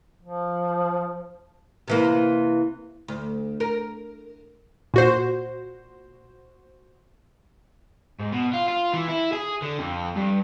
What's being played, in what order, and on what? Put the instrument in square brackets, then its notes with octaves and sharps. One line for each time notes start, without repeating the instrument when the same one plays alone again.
[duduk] F3
[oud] C3 E3 A#3
D2
A#4
[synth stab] A#2 F#4 C5
[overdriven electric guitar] G#2
B2
F4
F4
E3
E4
G#4
D3
F2
G2